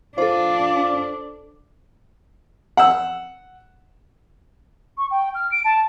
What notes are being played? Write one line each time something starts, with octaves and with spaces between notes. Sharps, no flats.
D4 F4 A4 C5 D5
F#5 E6
C#6
G5
F6
D7
A5